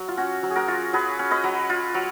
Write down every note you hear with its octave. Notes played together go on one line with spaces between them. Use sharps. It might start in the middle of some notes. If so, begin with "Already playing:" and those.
Already playing: F#3
F4
C#4 F#4
F#3
G#4
F#4 A#4
F4
F#3 G#4 B4
C#4
B4 D#5
F#3
F4
F#3